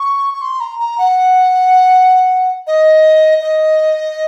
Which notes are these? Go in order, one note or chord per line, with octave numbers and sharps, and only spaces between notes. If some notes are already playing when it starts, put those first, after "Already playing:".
Already playing: C#6
C#6
C6
A#5
A#5
F#5
D#5
D#5